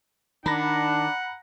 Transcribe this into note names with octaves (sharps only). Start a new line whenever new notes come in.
D#3 D4 F#5 A#5 B5 A#6